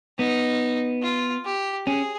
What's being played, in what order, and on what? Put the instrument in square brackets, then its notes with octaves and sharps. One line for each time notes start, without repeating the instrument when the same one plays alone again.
[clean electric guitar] B3 [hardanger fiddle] D#4
[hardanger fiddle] F4
G4
[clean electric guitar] C#4 [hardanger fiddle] G#4